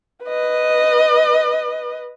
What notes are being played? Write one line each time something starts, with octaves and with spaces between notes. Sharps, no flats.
B4 D#5